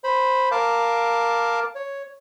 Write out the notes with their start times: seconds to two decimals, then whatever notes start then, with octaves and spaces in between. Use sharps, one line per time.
0.04 C5 B5
0.51 A#4 F5 A5 D6
1.75 C#5